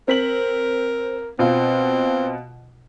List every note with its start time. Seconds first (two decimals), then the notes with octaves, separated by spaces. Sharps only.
0.08 C4 A#4 B6 F#7
1.39 B2 C4 F4